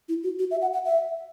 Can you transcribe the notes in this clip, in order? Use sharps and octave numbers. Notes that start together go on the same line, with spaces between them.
E4
F#4
F#4
E5
F#5
F#5
E5